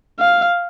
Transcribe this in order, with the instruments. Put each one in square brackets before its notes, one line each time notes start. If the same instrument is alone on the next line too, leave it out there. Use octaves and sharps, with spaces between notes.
[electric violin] F5